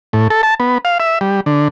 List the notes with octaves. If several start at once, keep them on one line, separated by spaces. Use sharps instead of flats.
A2
A4
A5
B3
F5
E5
G3
D3